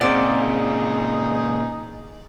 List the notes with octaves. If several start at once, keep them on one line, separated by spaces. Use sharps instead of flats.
A#2 C#3 C4 D#4 G#4 D5 F#5